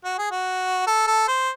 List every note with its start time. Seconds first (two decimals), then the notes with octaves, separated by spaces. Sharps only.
0.04 F#4
0.18 G#4
0.31 F#4
0.87 A4
1.07 A4
1.28 C5